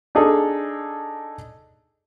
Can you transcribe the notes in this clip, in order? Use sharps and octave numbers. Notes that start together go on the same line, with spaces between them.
D4 D#4 G#4 A4